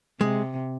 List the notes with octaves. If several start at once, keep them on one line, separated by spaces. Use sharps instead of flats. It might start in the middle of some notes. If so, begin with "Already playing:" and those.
C3 G#3